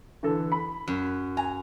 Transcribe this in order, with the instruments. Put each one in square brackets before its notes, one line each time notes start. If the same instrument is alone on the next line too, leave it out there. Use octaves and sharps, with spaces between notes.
[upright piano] D3 E3 A4
B5
[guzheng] F#2
[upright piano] G#5 [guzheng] A#5